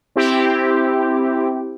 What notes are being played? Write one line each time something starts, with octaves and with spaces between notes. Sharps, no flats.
C4 E4 G4